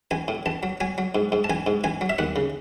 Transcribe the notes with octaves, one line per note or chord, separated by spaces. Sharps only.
A1 G#5
A2
A1 A5
F#3
F#3 G#5
F#3
G#2
G#2
A5
A1 G#5
G#2
A1 G#5
F#3
E5
D#2 F#5
C#3